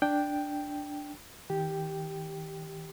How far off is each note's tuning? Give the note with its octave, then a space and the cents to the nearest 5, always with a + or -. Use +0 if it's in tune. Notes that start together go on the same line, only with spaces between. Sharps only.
D4 +0 G5 +0
D#3 +30 G4 +0 G5 +0